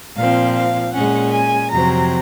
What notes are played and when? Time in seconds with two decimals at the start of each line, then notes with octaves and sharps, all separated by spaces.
0.16 A#2 F3 C4 F5
0.55 F5
0.93 A#2 G#3 C#4 F#5
1.32 G#5
1.71 F2 C3 F#3 C4 A#5